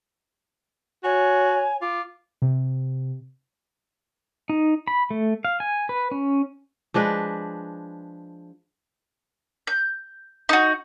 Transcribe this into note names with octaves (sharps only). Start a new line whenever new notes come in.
F#4 C#5 G#5
F4 D6
C3
D#4
B5
A3
F5
G#5
B4
C#4
F3 G#3 D4 B4
G6
D#4 F#4